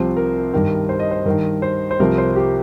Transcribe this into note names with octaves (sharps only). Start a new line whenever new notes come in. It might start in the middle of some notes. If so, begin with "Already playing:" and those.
Already playing: C2 C3 F3 C5
A#4
G2 D#3 A#4
C5
D#5
C5
G2 D#3 A#4
C5
C5
C2 C3 F3 A#4
C5
G4